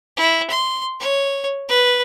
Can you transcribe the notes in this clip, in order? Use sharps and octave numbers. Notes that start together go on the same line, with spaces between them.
E4
C6
C#5
B4